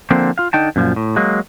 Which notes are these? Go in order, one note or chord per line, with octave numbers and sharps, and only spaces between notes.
D3 F3 A#3 C4 A4 C5
F4 F5
D3 D#4 G5 A5
F#2 A#2 F3
A2
F#3 G#3 A#3